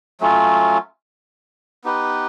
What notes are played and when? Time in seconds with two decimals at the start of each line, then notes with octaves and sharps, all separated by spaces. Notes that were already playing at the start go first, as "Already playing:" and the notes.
0.21 F#3 A3 C#4 F4
1.84 B3 D#4 G4 B4